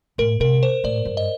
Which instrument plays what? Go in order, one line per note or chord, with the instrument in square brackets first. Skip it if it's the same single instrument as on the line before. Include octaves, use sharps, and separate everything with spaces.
[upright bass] A2 [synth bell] A#4
[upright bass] C3 [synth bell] A#4
[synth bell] C5
[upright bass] A2 [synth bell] D5
[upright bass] G2
[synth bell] D#5